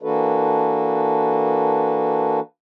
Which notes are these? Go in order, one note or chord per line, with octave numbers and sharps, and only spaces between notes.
E3 A#3 D4 F#4 A4 B4